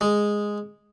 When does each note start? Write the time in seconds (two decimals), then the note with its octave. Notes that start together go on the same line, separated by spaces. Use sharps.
0.01 G#3